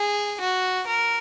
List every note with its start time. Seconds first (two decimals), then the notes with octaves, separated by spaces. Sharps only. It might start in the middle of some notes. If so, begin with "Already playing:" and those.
Already playing: G#4
0.40 F#4
0.87 A#4